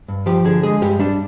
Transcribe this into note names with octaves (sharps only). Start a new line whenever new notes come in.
G2
F3 G4
D3 G#4
G#3 G#4
G2 G4
G3 D4